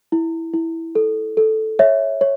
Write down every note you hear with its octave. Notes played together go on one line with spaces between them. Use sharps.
E4
E4
A4
A4
C#5 E5
C#5